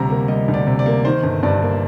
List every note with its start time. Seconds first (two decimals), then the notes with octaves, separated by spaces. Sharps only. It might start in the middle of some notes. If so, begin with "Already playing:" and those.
Already playing: D2 C3 G3 A#5
0.10 A#3
0.28 G3 D#5
0.48 D2
0.54 D5
0.67 C3
0.79 D5
0.86 A#3
1.05 D#3 C5
1.23 G1
1.43 G2 D5
1.62 A#3